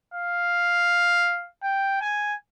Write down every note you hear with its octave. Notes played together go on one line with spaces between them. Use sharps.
F5
G5
G#5